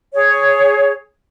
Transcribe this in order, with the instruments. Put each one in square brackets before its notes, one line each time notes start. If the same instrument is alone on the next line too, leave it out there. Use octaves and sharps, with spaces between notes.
[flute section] G#4 C#5